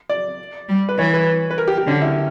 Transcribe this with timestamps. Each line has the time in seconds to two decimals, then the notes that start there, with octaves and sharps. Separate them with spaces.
0.10 D5
0.69 G3
0.89 B4
0.98 E3 C#5
1.14 B4
1.51 B4
1.58 A#4
1.68 G4
1.78 G4
1.87 D3 C#4
2.02 E4